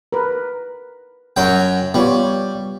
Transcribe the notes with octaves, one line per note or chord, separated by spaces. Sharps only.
A#4 B4
F#2 F#3 G5
G3 B3 F4 C#5